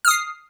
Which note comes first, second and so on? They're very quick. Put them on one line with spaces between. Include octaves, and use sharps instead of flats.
F6 D#6 C7